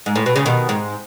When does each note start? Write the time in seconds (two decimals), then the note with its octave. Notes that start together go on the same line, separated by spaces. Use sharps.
0.06 G#2
0.16 A2
0.26 B2
0.36 C#3
0.46 B2 D#3
0.69 G#2